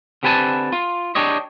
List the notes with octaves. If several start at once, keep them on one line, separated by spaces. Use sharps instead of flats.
D3 C4 G4 B4 G#5 A5
F4
D4 G4 C#5 D#5